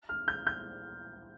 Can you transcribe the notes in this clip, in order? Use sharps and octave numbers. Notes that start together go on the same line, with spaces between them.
F6
G6
G6